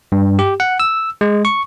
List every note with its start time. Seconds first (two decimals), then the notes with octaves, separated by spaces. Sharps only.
0.12 G2
0.39 G4
0.60 F#5
0.80 E6
1.21 G#3
1.45 C#6